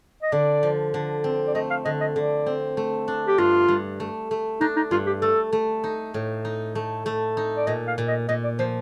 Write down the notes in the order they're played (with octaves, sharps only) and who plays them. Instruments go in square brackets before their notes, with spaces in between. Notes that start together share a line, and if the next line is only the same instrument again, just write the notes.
[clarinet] D#5
[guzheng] D3 [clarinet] D5
[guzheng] F3
D3
C4
[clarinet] D5
[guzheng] A3 [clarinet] D#5
[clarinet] F5
[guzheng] D3 [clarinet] D#5
[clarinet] D#5
[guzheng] D3 [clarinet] D5
[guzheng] C4
A3
D4
[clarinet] G4
[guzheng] G2 [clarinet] F4
[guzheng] G2
A3
A3
[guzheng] D4 [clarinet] D#4
[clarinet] D#4
[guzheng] G2 [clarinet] F4
[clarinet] G4
[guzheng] A3 [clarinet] A4
[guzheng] A3
D#4
A2
D#4
A3
A3
D#4
[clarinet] D5
[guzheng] A#2 [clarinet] D#5
[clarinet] F5
[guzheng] A#2
[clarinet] D#5
[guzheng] A#2 [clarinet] D#5
[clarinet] D5
[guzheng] F3 [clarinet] C5